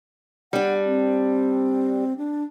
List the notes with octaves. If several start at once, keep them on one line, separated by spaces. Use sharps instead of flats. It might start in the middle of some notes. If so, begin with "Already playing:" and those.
G3 D4 F#5
C4
D4